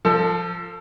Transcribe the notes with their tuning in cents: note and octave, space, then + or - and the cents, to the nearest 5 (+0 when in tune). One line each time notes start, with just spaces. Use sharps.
F3 +0 A4 +30